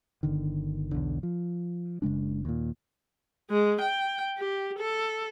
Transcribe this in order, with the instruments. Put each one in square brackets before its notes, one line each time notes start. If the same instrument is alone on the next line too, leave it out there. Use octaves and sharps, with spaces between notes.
[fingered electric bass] G1 D3 D#3
B1 E2 D3
F3
F#1 C#3 G#3 D4
D#2 A#2
[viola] G#3
G5
G4
A4